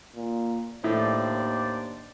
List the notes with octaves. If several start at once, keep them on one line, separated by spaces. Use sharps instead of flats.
A#2
D#2 A2 D4 C5 D5